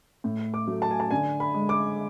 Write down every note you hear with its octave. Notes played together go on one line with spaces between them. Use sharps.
A2
D6
F#3 A3
A5
G#5
A5
D3 G#5
B5
G#3
D6